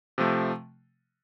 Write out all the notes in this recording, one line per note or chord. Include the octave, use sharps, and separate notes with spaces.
C3 F3 A3